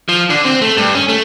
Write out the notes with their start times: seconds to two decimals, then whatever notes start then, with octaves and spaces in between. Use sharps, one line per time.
0.09 F3
0.30 D3
0.45 C4
0.62 A3
0.77 G2
0.94 C#4
1.09 A3